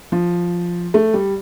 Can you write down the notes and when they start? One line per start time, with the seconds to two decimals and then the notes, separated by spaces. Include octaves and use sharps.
0.12 F3
0.94 A3
1.14 G3